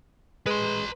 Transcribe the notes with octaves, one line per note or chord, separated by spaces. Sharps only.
G#3 B4 C6